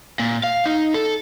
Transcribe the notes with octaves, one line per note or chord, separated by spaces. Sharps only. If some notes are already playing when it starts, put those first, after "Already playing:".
A#2
F5
D#4
A4